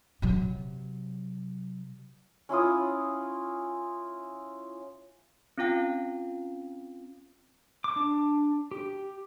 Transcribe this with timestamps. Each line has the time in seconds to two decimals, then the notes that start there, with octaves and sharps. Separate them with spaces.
0.22 C3 F#3
2.49 C#4 E4 F4 D#6
5.58 C4 C#4 F4 F5 G5
7.84 D6
7.96 D4
8.71 G4